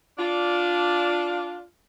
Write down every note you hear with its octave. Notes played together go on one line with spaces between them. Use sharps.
D4 F4